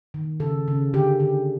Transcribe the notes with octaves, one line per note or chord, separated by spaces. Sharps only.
D#3
C#3 A4
C#3
D3 G4
D3